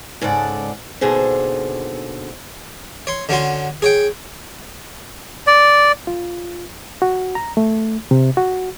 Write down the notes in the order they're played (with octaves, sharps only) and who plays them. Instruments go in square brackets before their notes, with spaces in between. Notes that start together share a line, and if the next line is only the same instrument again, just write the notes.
[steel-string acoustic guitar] G#2 C#3 A4 D5 F#5
D#2 B2 D3 G#4 C5
[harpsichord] C#5 C6
D3 C#4 F#4 C6
G#4 C#5 G5
[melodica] D5
[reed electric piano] F4
F#4
A#5
A3
C3
F#4